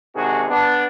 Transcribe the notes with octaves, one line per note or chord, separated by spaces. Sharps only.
C3 D#3 G#3 D4 F#4 G#4
B3 D4